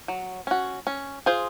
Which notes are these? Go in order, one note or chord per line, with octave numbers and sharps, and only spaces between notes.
F#3
C#4 F#4
C#4
F4 G#4 C5